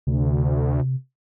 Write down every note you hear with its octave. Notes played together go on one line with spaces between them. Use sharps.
D2 C3